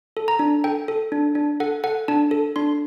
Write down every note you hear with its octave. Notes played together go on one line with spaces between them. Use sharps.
A4
A#5
D4
A4 G5
A4
D4
D4
A4 F#5
A4 F#5
D4 A5
A4
D4 C6